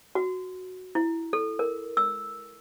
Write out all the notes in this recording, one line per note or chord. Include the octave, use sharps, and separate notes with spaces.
F#4
E4
A4
A#4
E6